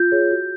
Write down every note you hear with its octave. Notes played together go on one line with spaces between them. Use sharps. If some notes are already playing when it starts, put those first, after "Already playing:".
Already playing: F4 G6
G#4 C#5
F#4